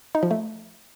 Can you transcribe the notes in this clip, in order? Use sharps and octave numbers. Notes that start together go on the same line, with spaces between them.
D#4
F3
A3